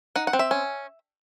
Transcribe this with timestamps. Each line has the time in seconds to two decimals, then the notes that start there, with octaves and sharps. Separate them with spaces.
0.16 D#4 F#5
0.27 F#5
0.33 C4
0.39 E5
0.51 C#4